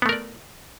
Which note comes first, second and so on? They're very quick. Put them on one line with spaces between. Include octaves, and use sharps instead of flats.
B3 A3 A#4 D5